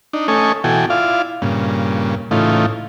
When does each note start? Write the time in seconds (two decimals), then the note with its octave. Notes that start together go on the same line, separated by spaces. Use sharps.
0.13 D4 D#4
0.28 A3 C#4 A4 D#5 G#5 C#6
0.64 B2 E3 F#4 A4 G5 G#5
0.90 E4 F4 D5 F5
1.42 G2 A#2 C#3
2.31 A2 C#3 E3 A3 D#4 F4